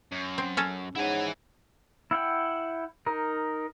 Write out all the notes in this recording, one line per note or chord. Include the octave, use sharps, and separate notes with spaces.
F#2
C4
C#4 A4
G#2 E4 C#5 F#5 G#5
E4 F#5 G5
D#4 A#4